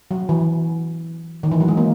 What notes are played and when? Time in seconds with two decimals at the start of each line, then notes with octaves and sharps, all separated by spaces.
0.11 F#3
0.29 E3
1.43 D#3
1.52 E3
1.60 F#3
1.68 G#3
1.77 A#3